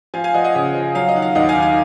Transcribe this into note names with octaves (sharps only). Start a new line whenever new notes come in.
F3 F5 G#5
F5 G#5
F3 D#5 F#5
D#5 F#5
C#3
F3
F#3 F5
D#5
D#3 F#5
F5
D#2 D#5 F#5
F5 G#5
D#3
F5